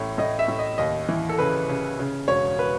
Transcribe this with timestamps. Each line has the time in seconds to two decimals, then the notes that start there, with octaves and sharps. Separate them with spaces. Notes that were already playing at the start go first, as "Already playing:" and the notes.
Already playing: A1 A2 C#5
0.18 A2 D#5
0.39 E5
0.48 A2
0.59 D#5
0.78 D#2 D#5
1.09 E3
1.29 A4
1.38 C#3 B4
1.69 C#3
1.99 C#3
2.28 E1 C#5
2.59 B4